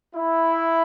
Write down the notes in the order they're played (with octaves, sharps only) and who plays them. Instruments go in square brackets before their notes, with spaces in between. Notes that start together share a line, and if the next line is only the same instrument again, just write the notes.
[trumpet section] E4